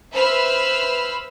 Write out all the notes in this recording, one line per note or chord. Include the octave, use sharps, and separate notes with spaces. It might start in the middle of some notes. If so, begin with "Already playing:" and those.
B4 C5 E5 B5 E6 F6